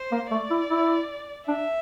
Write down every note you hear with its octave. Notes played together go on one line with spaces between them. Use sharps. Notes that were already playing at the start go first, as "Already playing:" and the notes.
Already playing: C5
A#3
A3 D5
E4
E4
D4 E5